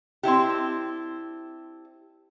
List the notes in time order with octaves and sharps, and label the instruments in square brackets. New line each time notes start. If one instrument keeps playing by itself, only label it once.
[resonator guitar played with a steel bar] C4 D4 E4 G4